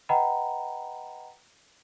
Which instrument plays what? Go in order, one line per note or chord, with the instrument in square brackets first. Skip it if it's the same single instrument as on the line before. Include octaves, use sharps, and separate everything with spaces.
[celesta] B4 D#5 F#5 G5 A#5 B5